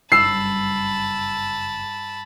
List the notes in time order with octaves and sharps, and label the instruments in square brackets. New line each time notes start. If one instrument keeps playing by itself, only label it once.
[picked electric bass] F#1 [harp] G2 [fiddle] A5 B5 [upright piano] E6 C7